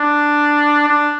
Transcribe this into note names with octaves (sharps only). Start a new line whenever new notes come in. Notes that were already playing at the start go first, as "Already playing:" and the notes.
Already playing: D4
D4